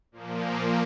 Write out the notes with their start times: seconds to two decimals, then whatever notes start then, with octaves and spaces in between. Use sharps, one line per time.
0.12 A#2 F3 A#3